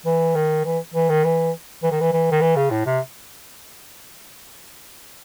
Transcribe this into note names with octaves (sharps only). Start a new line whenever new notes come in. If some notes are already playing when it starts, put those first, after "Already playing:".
E3
D#3
E3
E3
D#3
E3
E3
D#3
E3
E3
D#3
E3
C#3
A2
C3